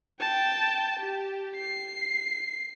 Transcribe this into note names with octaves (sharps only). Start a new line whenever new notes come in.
G5 A5
G4
C7